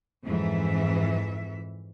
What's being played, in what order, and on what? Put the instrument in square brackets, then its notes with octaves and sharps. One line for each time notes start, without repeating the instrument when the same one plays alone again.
[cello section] F2 G#2 E3 E5